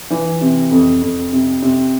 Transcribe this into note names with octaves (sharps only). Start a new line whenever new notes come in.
E3
C3
F2
F2
C3
C3